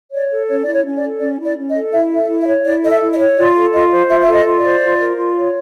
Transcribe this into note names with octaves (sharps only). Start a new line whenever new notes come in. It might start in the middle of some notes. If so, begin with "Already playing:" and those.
C#5 D5
A4
C#4 C#5
E4 D5
C#5
C#4
D5
A4
C#4 D5
E4
D5
C#4
D#5
A4
E4 E5
A4
E5
E4
E5
C#5
E4 D5
A4 D#5
E5
E4
D#5
C#5
F4 D5
A4
F4 D#5
C5
F4 E5
A4 E5
D#5
F4
D5
C5
F4
A#4
F4
C#5